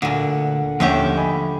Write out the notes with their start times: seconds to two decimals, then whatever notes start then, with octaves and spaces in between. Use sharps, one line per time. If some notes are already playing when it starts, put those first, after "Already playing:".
0.02 D2 A#2 D3 F#5
0.80 D#2 D3 F3 A3 C#4 G4 E5
1.17 D#5 G#5 B5